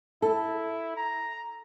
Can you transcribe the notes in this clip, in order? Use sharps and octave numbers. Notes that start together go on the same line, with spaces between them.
E4 A4
A#5